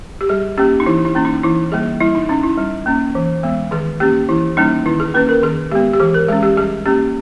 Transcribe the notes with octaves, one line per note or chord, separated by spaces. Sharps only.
G4
G3 G#4
A#3 C#4 G4
D#4
E3 E4
E4
A#3 C#4
D#4
E3 E4
G3 A#3 G#4
G3 E4
D#4
C#4 D#4
E4
G3
A#3 C#4
E3
G#3 B3
D#3 G#4
A#3 C#4 G4
E3 E4
G3 A#3 C#4 D#4
D#3 E4
G#4
A#3 C#4 B4
A#4
D#3 G#4
G#3 B3 G4
G4
E3 G#4
A#4
G#3 C#4 G#4
G4
G3 G#4
A#3 C#4 G4